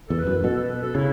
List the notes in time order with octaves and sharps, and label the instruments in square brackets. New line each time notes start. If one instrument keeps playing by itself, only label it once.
[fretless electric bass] E2 [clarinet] A4
[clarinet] B4
[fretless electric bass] F#2
[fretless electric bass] B2 [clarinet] A4
[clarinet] A4
B4
A4
[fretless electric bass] C#3 [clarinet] E4